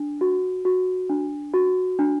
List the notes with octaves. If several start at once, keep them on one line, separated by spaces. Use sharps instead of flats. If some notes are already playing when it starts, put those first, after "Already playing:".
Already playing: D4
F#4
F#4
D4
F#4
D4